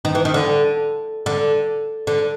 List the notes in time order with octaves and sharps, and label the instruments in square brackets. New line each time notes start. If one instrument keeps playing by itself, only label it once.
[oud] D#3
E3
D#3
D3
D3
D3